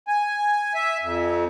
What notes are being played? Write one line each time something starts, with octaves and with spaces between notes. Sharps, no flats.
G#5
E5
F2